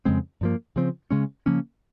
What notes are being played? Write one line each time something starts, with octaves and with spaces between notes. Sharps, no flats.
F2 C#3 G#3 C4
G2 F3 A#3
C#3 F3 C4
C#3 G#3 C#4
C#3 F3 A#3 C#4